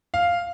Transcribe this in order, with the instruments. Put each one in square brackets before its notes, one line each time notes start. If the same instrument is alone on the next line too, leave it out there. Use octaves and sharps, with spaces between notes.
[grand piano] F5